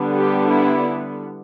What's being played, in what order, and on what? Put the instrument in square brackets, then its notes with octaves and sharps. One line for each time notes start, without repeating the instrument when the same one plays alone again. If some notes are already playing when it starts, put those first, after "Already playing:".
Already playing: [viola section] D3 G3 B3 D4
G4
E4